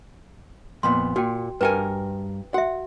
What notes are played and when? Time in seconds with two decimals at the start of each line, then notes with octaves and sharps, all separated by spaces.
0.83 F2 A#2 B3 C6
1.16 A#2 F#4 G5
1.61 G2 A#4 B4 G5 G#5
2.54 F#4 E5 F#5